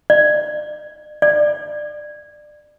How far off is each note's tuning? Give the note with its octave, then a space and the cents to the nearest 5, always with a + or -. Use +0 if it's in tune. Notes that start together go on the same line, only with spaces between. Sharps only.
D5 +40
D5 +20